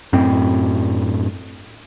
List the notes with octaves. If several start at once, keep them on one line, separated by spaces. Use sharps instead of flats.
F#2 A2 C4